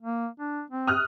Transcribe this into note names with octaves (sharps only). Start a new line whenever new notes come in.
A#3
D4
C4
D#6 F6 F#6